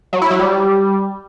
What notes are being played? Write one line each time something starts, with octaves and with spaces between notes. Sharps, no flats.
F#3
E4
F#3
G3